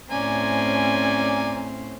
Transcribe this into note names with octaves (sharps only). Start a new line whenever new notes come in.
A2 C4 C#4 C5 D5 G#5 A#5